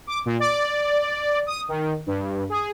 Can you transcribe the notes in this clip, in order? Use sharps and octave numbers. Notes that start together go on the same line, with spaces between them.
D6
A#2
D5
D#6
D#3
G2
G#4